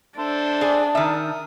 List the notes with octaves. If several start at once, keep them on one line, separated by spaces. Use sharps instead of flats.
D4 A4 C5 E5
G#4 D5 G#5 A5
D#3 A#4 E5 D#6